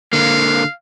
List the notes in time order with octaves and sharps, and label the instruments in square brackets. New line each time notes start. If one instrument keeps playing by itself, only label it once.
[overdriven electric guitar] D3 A#3 [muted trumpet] F5